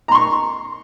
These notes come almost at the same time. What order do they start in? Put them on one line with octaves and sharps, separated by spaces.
A#5 C6 C#6